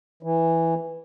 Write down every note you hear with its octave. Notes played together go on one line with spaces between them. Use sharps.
E3